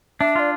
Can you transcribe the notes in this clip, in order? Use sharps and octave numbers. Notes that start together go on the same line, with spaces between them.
D4 E5
F4 D5